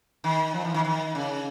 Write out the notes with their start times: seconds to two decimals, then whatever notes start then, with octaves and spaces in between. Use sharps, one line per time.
0.24 D#3
0.54 F3
0.65 E3
0.74 D#3
0.85 D#3
1.15 C#3